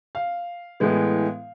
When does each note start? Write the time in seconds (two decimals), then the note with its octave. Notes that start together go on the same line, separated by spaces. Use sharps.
0.15 F5
0.80 A2 E3 G#3 B3